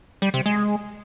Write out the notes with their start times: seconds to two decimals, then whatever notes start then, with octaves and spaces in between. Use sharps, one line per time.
0.22 G3
0.34 C3
0.46 G#3